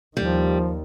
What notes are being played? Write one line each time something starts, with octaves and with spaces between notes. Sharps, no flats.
D#2 D#3 F3 G3